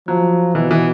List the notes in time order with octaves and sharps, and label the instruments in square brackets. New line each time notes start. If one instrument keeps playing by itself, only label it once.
[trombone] F3 [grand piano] F#3
[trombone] B2 [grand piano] E3
[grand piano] E3